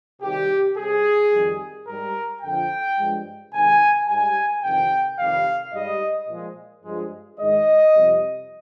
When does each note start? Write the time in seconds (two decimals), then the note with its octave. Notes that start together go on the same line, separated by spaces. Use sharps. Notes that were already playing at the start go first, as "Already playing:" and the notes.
0.21 C3 D#3 G3 G4
0.76 C3 G3 G#4
1.31 F2 D#3 G3
1.86 G#2 G3 A#4
2.42 F2 D3 F3 G5
2.97 G2 F3 G#3
3.52 C3 D#3 G#3 G#5
4.08 G#2 G3 G#5
4.62 F2 C3 D#3 G5
5.18 F2 C3 D#3 G3 F5
5.73 G#2 G3 D#5
6.28 A#2 F3 G#3
6.84 G2 F3 G#3
7.38 G#2 D#3 G#3 D#5
7.94 F2 C3 G3